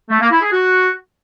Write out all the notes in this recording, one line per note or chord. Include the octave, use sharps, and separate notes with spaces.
A3
A#3
E4
G#4
F#4